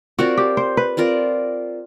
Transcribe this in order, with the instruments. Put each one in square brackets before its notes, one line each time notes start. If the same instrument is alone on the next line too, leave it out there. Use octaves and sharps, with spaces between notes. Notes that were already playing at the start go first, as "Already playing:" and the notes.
[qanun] C4 F4 A#4 D5 [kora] F#4
[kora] G4
C5
B4
[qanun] C4 F4 A#4 D5